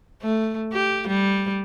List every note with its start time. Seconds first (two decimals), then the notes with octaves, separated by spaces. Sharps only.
0.22 A3
0.73 G4
1.08 G3